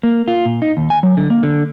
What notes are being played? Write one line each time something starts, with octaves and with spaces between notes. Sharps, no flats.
A#3
F4
A#2
D#4
D#2
G#5
F#3
D3
A#3
D3